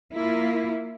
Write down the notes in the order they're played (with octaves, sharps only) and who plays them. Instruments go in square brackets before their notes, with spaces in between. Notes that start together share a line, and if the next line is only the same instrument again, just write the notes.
[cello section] A#3 E4 F4